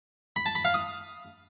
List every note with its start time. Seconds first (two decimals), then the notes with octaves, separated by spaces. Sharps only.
0.36 B5
0.46 A5
0.55 B5
0.65 F5
0.74 D#6